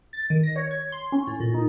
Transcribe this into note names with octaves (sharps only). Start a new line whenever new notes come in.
A6
D#3
A#6
C#5
G#6
C6
C#4
A2
A#2
D#4